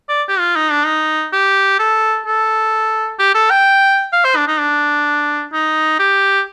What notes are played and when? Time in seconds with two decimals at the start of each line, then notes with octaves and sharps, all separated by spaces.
0.09 D5
0.28 G4
0.39 F4
0.56 D#4
0.71 D4
0.86 D#4
1.33 G4
1.79 A4
2.26 A4
3.19 G4
3.34 A4
3.51 G5
4.12 F5
4.25 C5
4.36 D4
4.47 D#4
4.59 D4
5.53 D#4
5.99 G4